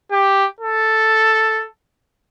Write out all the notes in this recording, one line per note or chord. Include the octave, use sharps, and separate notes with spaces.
G4
A4